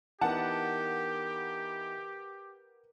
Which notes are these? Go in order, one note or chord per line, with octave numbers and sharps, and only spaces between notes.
E3 B3 D#4 G4 A#4 B4 F#5 A5